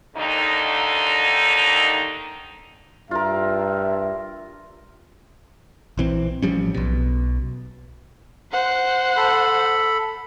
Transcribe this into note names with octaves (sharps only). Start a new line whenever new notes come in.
D#2 D3 D#4
G2 F4 A#4 E5
A#1 E3 C4
A1 F3 G3 C#4
B1 B2
C5 F#5
A4 B5